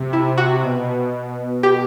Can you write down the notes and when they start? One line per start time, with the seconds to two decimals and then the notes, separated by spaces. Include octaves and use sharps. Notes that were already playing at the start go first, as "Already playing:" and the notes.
Already playing: C3
0.13 E4
0.38 F#4
0.64 B2
1.63 G4